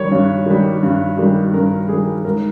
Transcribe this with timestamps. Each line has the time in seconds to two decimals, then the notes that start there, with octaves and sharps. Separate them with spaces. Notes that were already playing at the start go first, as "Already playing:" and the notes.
Already playing: G2 D#3 G3 C#5
0.11 G2
0.46 D#3 G3
0.83 G2
1.17 D#3 G3
1.54 G2 A#4
1.89 D#3 G3 G#4
2.25 G#2 A#4